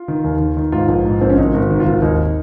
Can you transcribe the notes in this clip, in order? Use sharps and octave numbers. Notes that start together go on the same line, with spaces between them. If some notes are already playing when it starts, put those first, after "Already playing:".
Already playing: F4
D#3
D#2
D#3
D#3
G#2 F4
A#1
G#2
A#1 C4
C#4
G#1 D#4
G#1
D#3
F4
G#1
D#2 D#4